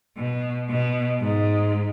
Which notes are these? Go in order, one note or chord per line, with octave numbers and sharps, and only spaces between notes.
B2
B2
G#2